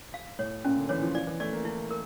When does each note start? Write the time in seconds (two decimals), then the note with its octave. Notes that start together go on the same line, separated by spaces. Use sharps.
0.14 F5
0.39 A2 C#5
0.65 A#2 C#4
0.77 D3
0.89 E3 C#5
1.02 F3
1.15 F3 D5
1.27 E3
1.40 A3 D5
1.53 A#3
1.65 E4
1.91 A#4